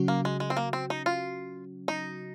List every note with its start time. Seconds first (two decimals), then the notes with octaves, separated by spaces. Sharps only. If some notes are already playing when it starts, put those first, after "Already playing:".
Already playing: C#3 F#3 C#4 F#4
0.08 A#3
0.25 G#3
0.40 G#3
0.50 C4
0.57 A#3
0.73 C4
0.90 D#4
1.06 F4
1.88 D#4